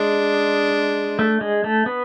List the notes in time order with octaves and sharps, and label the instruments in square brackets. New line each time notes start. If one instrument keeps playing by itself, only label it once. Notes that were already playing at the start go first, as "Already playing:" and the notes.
Already playing: [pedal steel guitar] G#3 [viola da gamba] D4
[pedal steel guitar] A3
G#3
A3
B3